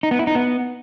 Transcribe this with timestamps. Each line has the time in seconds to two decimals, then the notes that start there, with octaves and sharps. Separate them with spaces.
0.03 D#4
0.11 B3
0.19 E4
0.27 D#4
0.35 B3